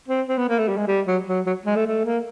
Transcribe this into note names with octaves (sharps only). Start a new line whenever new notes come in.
C4
C4
B3
A#3
A3
G3
G#3
G3
F#3
F#3
F#3
G#3
A3
A3
A#3